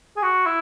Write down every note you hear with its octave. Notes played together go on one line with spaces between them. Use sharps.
G#4
F#4
E4